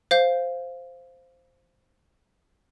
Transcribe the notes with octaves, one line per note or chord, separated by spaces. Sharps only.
C5 F5 G6